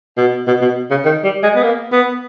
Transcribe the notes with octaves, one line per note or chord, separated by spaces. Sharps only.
B2
B2
B2
C#3
D#3
G3
G#3
B3
A#3
B3